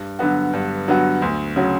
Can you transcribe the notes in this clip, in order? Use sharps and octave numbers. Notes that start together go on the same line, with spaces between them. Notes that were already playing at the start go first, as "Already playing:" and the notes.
Already playing: G2
D3 F#3 B3 F#4
G2
D3 F#3 B3 F#4
D2
C#3 F#3 C#4 F#4